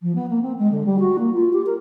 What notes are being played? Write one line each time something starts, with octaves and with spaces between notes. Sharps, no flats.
F3
B3
A#3
C4
G#3
D3
G3
F#4
A#3
F4
G4
A#4